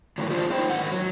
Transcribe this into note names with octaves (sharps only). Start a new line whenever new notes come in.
A2 D3 D#3 F#3
A#3 D4 F4 G4 G#4 C5
A#3 D#4 C5 G5
G#2 D#3 F#5
F#3